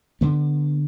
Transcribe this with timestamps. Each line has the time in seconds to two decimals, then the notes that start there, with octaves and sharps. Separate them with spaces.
0.21 D3 B3